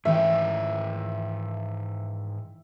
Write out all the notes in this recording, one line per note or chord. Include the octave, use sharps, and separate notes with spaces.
G#2 D#3 E3 A3 C#4 E5 G5